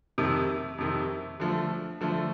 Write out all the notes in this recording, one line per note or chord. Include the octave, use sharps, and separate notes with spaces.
F2 C3 D#3
F2 C3 D#3
D3 F3 A3
D3 F3 A3